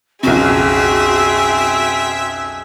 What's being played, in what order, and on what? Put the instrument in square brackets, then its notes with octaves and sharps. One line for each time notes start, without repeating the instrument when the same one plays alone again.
[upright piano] B1 F2 C#3 [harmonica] C4 E5 [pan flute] F#4 [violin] G#4